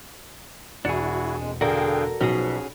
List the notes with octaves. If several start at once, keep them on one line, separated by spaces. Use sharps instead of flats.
E1 D4 E4 F#4 G#4 C#7
F2 G#3
D3 F#4 G#4 A#4 F5 G5
B1 B2 F3 C#4 F#4 G#4